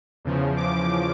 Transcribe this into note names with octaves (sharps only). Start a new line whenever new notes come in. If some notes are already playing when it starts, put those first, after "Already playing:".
E2 C#3 F3
D6